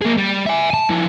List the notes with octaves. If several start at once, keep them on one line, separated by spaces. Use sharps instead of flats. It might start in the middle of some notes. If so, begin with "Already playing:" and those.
A#3 G#4
G3
E5 G#5
G#5 A5
F3 E4